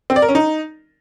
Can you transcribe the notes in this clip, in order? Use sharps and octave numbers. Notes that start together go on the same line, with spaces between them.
C4
D5
A#4
C#4
D#4